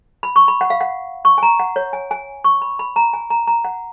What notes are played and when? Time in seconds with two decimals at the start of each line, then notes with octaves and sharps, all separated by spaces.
0.23 B5
0.36 C#6
0.48 B5
0.61 F#5
0.70 F5
0.81 F#5
1.25 C#6
1.38 G#5
1.43 A#5
1.60 F#5
1.76 C#5
1.93 G#5
2.11 G#5
2.44 C#6
2.62 B5
2.79 B5
2.96 A#5
3.13 G#5
3.30 A#5
3.47 A#5
3.65 F#5